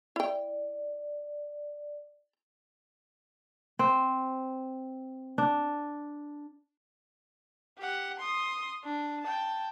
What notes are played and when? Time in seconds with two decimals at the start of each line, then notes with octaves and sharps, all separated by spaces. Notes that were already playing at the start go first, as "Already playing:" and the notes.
0.16 E4 D5 G5
3.79 C4
5.38 D4
7.78 G4 F#5
8.20 C6 D#6
8.84 D4
9.22 G5 A5